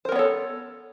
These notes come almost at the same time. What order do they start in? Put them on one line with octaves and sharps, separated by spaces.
C5 A#4 B3 C#5 A4